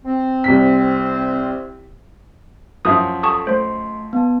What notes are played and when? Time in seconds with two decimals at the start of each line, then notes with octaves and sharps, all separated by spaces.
0.04 C4
0.44 C2 B6
2.85 F#2 F3 E5 D#6
3.23 A4 A5 C#6 D#6
3.47 A3 C5 C6
4.13 B3 A5